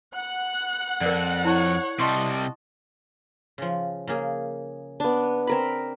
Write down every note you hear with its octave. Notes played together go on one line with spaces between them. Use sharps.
F#5 F#6
F2 A#4 D5
E4 C#5 A5
C3 G3 D#5 A5 C6 C#6
C#3 F3
C#3 A#3 G#4
B3 D4
C4 A#4 B5